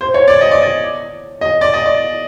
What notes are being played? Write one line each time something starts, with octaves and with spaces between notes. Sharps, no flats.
C5
C#5
D5
D#5
D5
D#5
D#5
D5
D#5
D5